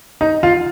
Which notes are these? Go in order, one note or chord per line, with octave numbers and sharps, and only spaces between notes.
D#4
F4